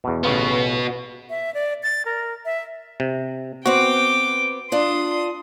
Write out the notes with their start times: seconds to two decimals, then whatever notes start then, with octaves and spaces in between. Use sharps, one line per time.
0.04 E2 B2
0.23 A1 C#3 B3 F4 F#4
1.30 E5
1.54 D5
1.83 A6
2.05 A#4
2.45 E5
3.00 C3
3.66 B3 C4 F#4 G5 D6
4.72 D4 F4 C6 D#6